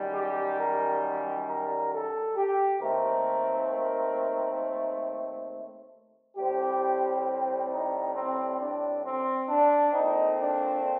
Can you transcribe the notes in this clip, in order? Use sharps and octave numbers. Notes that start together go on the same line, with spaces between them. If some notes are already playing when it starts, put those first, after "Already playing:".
Already playing: F#2 D#3 G3
G4
A#4
A#4
A4
G4
D#2 D#3 A3 C4 A#4
A#4
A2 G3 C4 G4
D#4
C4
D4
C4
D4
A#2 A3 C4 D#4
D4